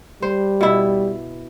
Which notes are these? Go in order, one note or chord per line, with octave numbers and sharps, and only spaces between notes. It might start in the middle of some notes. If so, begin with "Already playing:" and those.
G3 C5
B2 E4